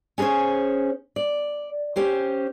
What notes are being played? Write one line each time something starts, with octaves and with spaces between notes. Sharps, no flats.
C#4 G#4 A4 C5 C#5
D5
C#4 G4 C5